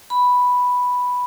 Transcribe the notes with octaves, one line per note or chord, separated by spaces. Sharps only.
B5